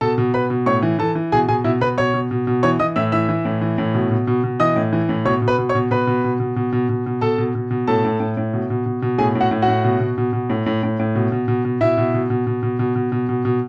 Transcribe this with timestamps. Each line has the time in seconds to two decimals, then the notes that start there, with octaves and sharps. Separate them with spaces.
0.01 B2 A4 A5
0.18 B2
0.34 B2 B4 B5
0.50 B2
0.66 A2 C#5 C#6
0.83 E3
0.99 E3 A4 A5
1.15 E3
1.32 B2 G#4 G#5
1.48 B2 G#4 G#5
1.64 B2 E4 E5
1.81 B2 B4 B5
1.98 B2 C#5 C#6
2.14 B2
2.31 B2
2.47 B2
2.63 E3 C#5 C#6
2.79 E3 D#5 D#6
2.96 A2 E5 E6
3.12 E3 E5 E6
3.29 E3
3.45 A2
3.61 E3
3.78 A2
3.94 B2
4.11 B2
4.27 B2
4.44 B2
4.60 E3 D#5 D#6
4.76 A2
4.93 E3
5.09 A2
5.25 B2 C#5 C#6
5.42 B2
5.48 B4 B5
5.58 B2
5.69 C#5 C#6
5.75 B2
5.91 B2 B4 B5
6.07 B2
6.24 B2
6.40 B2
6.56 B2
6.72 B2
6.89 B2
7.06 B2
7.21 B2 A4 A5
7.38 B2
7.55 B2
7.71 B2
7.87 A2 A4 A5
8.05 A2
8.20 A2
8.37 A2
8.53 B2
8.70 B2
8.86 B2
9.02 B2
9.18 A2 G#4 G#5
9.35 A2
9.41 F#4 F#5
9.51 A2
9.62 F#4 F#5
9.68 A2
9.84 B2
10.00 B2
10.18 B2
10.33 B2
10.50 A2
10.66 A2
10.83 A2
10.99 A2
11.15 B2
11.32 B2
11.48 B2
11.65 B2
11.81 B2 E4 E5
11.98 B2
12.14 B2
12.30 B2
12.47 B2
12.63 B2
12.79 B2
12.96 B2
13.12 B2
13.29 B2
13.45 B2